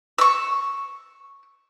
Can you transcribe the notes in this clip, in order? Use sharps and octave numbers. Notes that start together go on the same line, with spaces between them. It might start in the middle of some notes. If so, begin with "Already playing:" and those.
C#6 E6